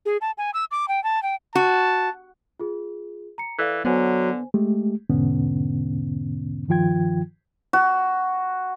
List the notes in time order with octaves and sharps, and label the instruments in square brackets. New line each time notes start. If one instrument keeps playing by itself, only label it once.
[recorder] G#4
A5
G#5
E6
D6
G5
A5
G5
[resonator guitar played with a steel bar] F#4 [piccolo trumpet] A5
[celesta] F4 G#4
A#5 C#7
[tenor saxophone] E3 [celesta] A4 D5 F5
[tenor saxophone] D3 [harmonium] F#3 [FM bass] B3 [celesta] C5 G#5
[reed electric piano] G#3 A3 G4
E2 G#2 B2 D3 B3 C#4
G2 D#3 F3 F4 G5 G#6
[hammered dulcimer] F#4